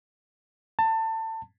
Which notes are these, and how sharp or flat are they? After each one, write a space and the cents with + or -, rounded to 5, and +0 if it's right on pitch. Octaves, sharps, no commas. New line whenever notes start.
A5 +25